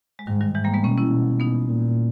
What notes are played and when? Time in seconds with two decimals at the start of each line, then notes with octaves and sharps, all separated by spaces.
0.19 G#3
0.27 G#2 D#3 G3
0.41 D#3 G3
0.55 G#2 E3 G#3
0.64 G3 A#3
0.74 G#3 B3
0.84 B2 A#3 C#4
0.97 C#4 E4
1.11 B2
1.40 B3 D#4
1.69 A#2